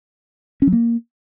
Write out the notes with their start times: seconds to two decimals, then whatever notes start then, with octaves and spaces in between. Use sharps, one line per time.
0.62 C#4
0.67 F#3
0.72 A#3